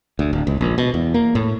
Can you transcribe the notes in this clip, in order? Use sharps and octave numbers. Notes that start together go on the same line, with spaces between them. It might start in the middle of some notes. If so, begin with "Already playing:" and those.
D2
D1
C#2
A#1
B2
E2
A#3
A2